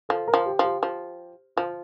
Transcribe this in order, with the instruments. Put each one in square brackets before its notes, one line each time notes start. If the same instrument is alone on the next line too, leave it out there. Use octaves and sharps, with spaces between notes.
[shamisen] F3 [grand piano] A4
[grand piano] A#4
[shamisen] F3
[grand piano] G4
[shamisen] F3
[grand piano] G4
[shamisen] F3
[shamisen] F3 [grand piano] F4